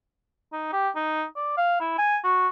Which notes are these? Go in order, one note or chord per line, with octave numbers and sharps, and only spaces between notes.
D#4
G4
D#4
D5
F5
E4
G#5
F#4